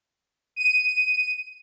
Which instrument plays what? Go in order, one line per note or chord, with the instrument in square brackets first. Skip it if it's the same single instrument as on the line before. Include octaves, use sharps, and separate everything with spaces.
[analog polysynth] D#7